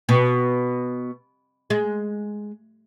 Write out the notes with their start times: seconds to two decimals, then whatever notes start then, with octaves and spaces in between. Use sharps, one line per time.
0.09 B2
1.70 G#3